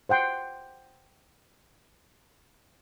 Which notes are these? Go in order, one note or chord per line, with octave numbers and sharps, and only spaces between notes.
C5 F#5 G5 C6